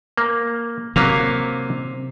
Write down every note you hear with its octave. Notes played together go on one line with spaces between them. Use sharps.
A#3
C3 F#3 A#3 F5